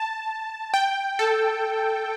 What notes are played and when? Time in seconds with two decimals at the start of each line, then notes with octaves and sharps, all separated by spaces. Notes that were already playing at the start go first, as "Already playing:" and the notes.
Already playing: A5
0.74 G5
1.19 A4